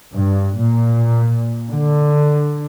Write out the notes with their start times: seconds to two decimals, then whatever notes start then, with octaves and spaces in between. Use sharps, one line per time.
0.13 G2
0.56 A#2
1.70 D3